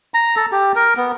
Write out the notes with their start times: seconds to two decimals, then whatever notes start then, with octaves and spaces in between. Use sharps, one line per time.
0.14 A#5
0.36 A4
0.52 G4
0.76 A#4
0.97 B3